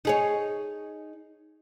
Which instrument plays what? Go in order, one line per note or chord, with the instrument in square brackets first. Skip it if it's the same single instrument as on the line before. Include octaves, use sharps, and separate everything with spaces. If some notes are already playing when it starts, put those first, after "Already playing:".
[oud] D#4 G#4 C#5